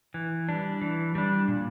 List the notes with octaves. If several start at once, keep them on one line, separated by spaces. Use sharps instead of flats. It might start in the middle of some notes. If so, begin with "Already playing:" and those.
E3
G3 D4
E3
G3 D4
A#2